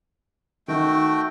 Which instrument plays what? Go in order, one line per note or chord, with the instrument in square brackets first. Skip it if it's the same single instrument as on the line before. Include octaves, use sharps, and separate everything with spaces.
[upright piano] D#3 [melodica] A3 F#4 G5